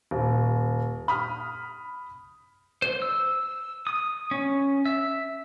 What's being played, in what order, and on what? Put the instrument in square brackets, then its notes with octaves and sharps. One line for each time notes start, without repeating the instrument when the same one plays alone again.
[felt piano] D#1
B5 D#6 F6
[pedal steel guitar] C5
E6
D#6
C#4
E5